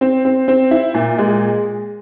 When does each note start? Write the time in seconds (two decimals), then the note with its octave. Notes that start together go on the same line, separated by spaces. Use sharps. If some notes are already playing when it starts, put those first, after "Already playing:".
0.01 C4
0.25 C4
0.48 C4
0.71 E4
0.94 A#2
1.18 G#3